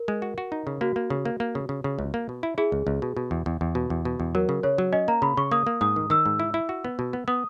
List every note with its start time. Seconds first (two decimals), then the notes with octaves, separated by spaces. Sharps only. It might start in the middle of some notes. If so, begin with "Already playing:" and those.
Already playing: A#4
0.08 G#3
0.22 F#4
0.38 F#4
0.52 D#4
0.67 C#3
0.81 A#3 F#4
0.96 A#3
1.10 C#3
1.25 A#3
1.40 A#3
1.55 C#3
1.69 C#3
1.84 C#3
1.99 C#2
2.14 A#3
2.29 B2
2.43 E4
2.58 E4 G#4
2.72 C#2
2.87 C#2
3.02 B2
3.17 B2
3.31 E2
3.46 E2
3.61 E2
3.75 B2
3.90 E2
4.05 B2
4.20 E2
4.35 F#3 A#4
4.49 C#3
4.63 C#3 C#5
4.78 F#3
4.93 C#4 D#5
5.08 A#3 A#5
5.22 C#3 B5
5.37 C#3 C#6
5.51 A#3 D#6
5.67 A#3
5.81 G#2 D#6
5.96 D#3
6.10 D#3 E6
6.26 G#2
6.39 E4
6.54 E4
6.69 F#4
6.85 B3
6.99 B2
7.13 B3
7.28 B3 D#6